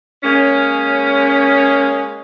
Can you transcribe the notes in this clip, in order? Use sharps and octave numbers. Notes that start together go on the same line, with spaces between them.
G#3 A#3 C#4